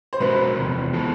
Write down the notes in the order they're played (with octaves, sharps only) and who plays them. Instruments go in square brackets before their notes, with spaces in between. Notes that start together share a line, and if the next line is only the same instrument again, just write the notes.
[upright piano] C5
[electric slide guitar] B2 G#3 C#4 F#4 A#4 [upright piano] B4
[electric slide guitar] E2 C3 F3
G#3 B3 E4 A4